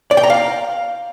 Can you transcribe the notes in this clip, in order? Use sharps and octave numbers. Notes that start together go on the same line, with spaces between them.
D5
G5
A#5
F5